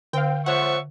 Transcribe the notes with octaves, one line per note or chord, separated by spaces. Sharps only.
D3 C4 F5 G5
F3 C5 C#5 E5 F#5 C#6